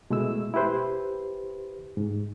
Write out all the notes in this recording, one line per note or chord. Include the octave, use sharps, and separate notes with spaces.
B2 G#3 A3 E4 E6
E4 G4 B4 C5
G#2